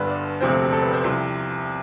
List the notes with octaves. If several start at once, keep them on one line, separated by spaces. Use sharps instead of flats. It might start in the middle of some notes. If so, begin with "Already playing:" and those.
Already playing: G1 G2 D3 B4
D5
E1 D2 C3 F3 C4 C5
A4
G4
A4
B4
C5
C2 C3 F3